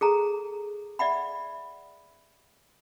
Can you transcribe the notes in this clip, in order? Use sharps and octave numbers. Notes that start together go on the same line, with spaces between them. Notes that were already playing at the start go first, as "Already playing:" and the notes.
G#4 A4 A#5
D5 E5 F#5 B5